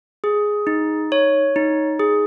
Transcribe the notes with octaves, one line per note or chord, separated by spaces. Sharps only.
G#4
D#4
C#5
D#4
G#4